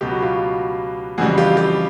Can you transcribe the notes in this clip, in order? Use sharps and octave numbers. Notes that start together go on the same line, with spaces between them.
C#2 B2 F#3 G4
F#4
F4 G4
F2 C#3 E3 G3 F#4 G#4
F4 G4
F4 G4